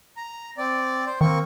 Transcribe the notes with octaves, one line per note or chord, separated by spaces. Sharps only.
A#5
C4 D5
C5
D#3 A#3 C4 C#6